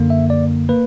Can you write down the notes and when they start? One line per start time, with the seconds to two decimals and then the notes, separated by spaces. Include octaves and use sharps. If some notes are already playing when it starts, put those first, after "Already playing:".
Already playing: F#2 D3 A#3
0.10 E5
0.30 D5
0.69 A#3 B4